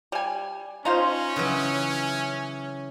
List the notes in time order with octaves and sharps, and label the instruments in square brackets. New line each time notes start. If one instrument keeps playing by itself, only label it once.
[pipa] G3 G#5
[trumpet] C#4 [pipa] D#4 F4 C5 [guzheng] A#5
[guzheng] C#3 E3 F#3